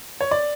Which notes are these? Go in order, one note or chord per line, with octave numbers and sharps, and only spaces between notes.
C#5
D5